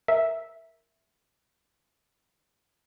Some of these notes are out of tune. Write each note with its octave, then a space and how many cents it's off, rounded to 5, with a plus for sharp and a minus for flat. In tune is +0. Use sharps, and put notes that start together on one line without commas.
A#4 +0 E5 +0